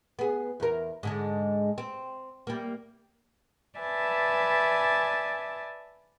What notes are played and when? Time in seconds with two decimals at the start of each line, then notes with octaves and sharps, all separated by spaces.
0.19 B3 G#4
0.60 E2 A#4
1.03 G#2 D3 G#3
1.78 C4
2.47 G3 A#3
3.78 B4 D5 E5 G#5 A5